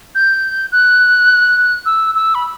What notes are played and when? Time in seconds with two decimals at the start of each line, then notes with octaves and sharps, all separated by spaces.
0.15 G6
0.72 F#6
1.86 E6
2.15 E6
2.35 B5